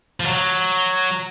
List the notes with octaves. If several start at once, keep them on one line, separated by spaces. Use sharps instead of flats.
F3
F#3